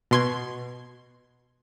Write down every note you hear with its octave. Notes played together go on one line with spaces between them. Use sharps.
B2 C6 G#6